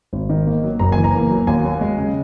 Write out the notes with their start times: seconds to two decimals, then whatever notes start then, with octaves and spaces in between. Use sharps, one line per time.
0.13 G#1
0.29 D#3
0.46 A#3
0.64 F#3
0.79 F#1 A#5
0.92 E3 G#5
1.04 A#5
1.14 A#3
1.31 F#3
1.47 D#2 G#5
1.64 F#3
1.81 G#3
1.98 C#3